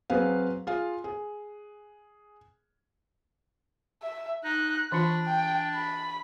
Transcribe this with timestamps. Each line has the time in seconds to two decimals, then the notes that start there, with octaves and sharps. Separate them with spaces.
0.10 F#3 C4 G#4 B4 F5
0.67 F4 G#4 F5
1.04 G#4
4.02 E5
4.44 D#4 F#6
4.92 E3 D4 F4 B5
5.26 G5
5.74 B5